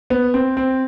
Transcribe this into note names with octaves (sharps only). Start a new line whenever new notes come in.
B3
C4
C4